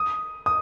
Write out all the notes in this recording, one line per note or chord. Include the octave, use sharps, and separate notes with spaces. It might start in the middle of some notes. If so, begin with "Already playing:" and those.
Already playing: D#6
D#6